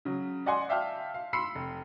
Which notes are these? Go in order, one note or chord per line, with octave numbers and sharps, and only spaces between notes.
C#3 F#3
D5 D#5 F#5 G#5 C6
D5 E5 F5 G5 A5 F6
F5
B5 C6 E6 C7 C#7
F1